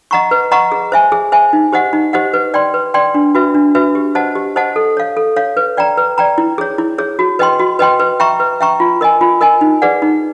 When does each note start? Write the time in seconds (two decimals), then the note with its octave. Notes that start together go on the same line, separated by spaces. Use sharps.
0.11 D#5 F#5 A#5 C#6
0.31 B4
0.51 D#5 F#5 A#5 C#6
0.72 G#4
0.92 C5 E5 G#5
1.12 G#4
1.32 C5 E5 G#5
1.53 D#4
1.73 G4 C5 D#5 F#5
1.93 D#4
2.13 G4 C5 D#5 F#5
2.33 B4
2.54 D5 G5 C6
2.74 B4
2.94 D5 G5 C6
3.14 D4
3.35 F#4 B4 E5
3.55 D4
3.75 F#4 B4 E5
3.95 G4
4.15 C5 D#5 F#5 A5
4.35 G4
4.56 C5 D#5 F#5 A5
4.76 A4
4.97 C#5 F5
5.17 A4
5.36 C#5 F5
5.57 B4
5.77 D5 G5 A#5
5.97 B4
6.18 D5 G5 A#5
6.38 E4
6.58 G#4 C#5
6.78 E4
6.98 G#4 C#5
7.19 F#4
7.39 B4 D#5 G5 C6
7.59 F#4
7.79 B4 D#5 G5 C6
8.00 B4
8.20 E5 G5 A#5 C#6
8.40 B4
8.61 E5 G5 A#5 C#6
8.80 F4
9.01 A#4 D#5 G#5
9.21 F4
9.41 A#4 D#5 G#5
9.61 D#4
9.82 G#4 B4 D5 F#5
10.02 D#4